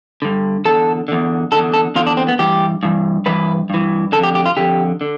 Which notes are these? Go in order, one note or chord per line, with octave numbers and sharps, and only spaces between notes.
G2 D3
E2 D3 A4
E2 D3
E2 D3 A4
A4
E2 D3 F4
D4
C4
B3
G2 E3 G4
G2 E3
G2 E3 B4
G2 E3
F2 D3 A4
G4
G4
F4
F2 D3 G4
D3